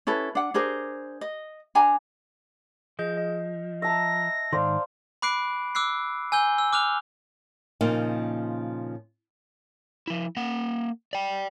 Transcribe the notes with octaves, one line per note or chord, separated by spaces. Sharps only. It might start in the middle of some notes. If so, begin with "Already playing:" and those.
C#4 E4 A4 B4
D4 F#5
D4 G#4 A#4 C5
D#5
D4 G#5 A#5
F3 G#4 D#5 G6
D#5
E5 A5 A#5 A#6
G#2 D#3 C5 D5 F5
B5 D6 F#6 C7 D7
D6 E6 F#6 C7
G#5 E6 G6 G7
E6
D6 F6 F#6 F7
A#2 C#3 F3 A#3 D#4
F3 E4
A#3 F#5
D5 G5